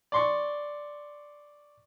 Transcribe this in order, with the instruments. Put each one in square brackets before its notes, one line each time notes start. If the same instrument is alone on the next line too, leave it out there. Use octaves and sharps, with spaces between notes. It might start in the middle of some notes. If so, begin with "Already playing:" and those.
[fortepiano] D5 C6 C#6